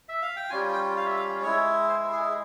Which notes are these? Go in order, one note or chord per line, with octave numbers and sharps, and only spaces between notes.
E5
F5
G5
G3 C#4 F4 G#5
G5
F5
E5
F5
G#3 E4 C#5
C5
G#4